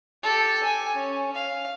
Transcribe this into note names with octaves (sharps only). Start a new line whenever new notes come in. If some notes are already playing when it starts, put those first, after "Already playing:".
G4 A4
G#5
C#4
F5